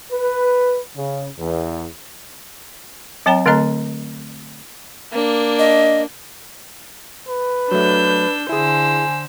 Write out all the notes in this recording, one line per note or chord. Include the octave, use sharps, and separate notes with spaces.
B4
C#3
E2
F#3 C4 C#5 G5 A#5
D3 A3 C4 A4 D#5 A#5
A#3 D4
D#5
B4
F#3 A3 D4 E6 G6
D3 E4 G#4 C5 G#5 E6